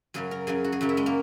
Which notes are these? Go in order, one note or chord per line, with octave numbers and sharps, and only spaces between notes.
F#2 C#3 F#3 G#4
A#4
F#2 C#3 F#3 G#4
F#4
G#4
F#2 C#3 F#3
E4
G#3
A#3